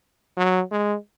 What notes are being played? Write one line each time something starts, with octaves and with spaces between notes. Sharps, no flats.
F#3
G#3